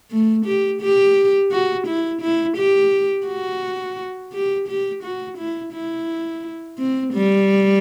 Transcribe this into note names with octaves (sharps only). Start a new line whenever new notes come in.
A3
G4
G4
F#4
E4
E4
G4
F#4
G4
G4
F#4
E4
E4
C4
G3